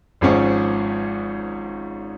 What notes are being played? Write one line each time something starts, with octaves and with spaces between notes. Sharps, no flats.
G#1 G#2 F3 G#3 C#4